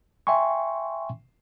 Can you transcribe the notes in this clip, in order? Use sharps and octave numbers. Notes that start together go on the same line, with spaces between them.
E5 G5 G#5 C6 C#6